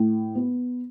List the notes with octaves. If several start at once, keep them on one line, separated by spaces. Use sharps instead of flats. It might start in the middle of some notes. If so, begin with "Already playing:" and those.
Already playing: A2
B3